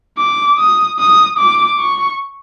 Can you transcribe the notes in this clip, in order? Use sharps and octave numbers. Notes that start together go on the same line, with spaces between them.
D6
D#6
D#6
D6
C#6